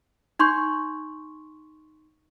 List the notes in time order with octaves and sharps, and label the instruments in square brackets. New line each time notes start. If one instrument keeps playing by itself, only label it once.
[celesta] D#4 C6 C#6 G6